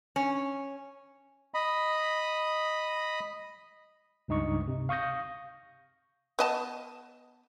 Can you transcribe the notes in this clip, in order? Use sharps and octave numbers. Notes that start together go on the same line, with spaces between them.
C#4
D#5 B5
C#2 G2 D#4 D#5 C#6
C3
F5 C#6 D#6 G6 A#6
B3 D#5 A5